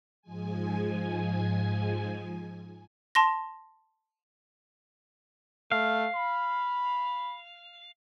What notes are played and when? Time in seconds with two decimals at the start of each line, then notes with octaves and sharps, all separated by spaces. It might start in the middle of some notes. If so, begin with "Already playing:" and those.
0.22 G#2 F3 G#3 G#5
3.15 A5 C6 A#6
5.72 A3 F5
6.15 B5